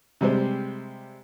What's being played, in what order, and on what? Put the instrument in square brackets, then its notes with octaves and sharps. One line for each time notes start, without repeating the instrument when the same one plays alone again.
[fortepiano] C3 G3 G#3 C5